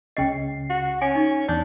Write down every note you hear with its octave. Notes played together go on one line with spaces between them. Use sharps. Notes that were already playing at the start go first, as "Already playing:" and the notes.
C#2 C#3 D#5 G5 C7
F#4
C#4 G#5
D#4
E2 D4 C#5